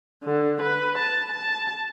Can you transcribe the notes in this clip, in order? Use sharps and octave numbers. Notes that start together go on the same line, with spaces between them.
D3
B4
A5
A5